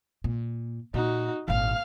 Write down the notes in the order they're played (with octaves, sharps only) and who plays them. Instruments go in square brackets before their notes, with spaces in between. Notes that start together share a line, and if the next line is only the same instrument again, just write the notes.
[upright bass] A#2
[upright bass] A#2 [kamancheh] D#4 F#4
[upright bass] G#1 A#2 [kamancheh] F5 F6